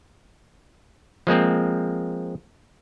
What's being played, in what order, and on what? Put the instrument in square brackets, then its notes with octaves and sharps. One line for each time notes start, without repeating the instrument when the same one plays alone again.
[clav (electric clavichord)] F3 G#3 A#3 C4